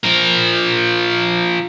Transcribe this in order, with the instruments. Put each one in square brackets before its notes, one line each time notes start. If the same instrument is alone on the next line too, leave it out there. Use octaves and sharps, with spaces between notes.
[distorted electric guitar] F3 A#4